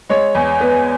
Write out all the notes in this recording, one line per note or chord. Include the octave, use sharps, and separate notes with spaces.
G#3 C#5
E2
B3